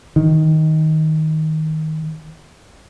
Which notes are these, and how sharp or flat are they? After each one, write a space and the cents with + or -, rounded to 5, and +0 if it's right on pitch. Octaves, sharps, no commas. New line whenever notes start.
D#3 +10